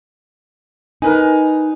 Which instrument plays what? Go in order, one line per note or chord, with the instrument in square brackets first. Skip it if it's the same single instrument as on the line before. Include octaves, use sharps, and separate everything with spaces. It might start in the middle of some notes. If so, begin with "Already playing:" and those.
[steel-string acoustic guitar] D#4 [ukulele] A#4 B4 G#5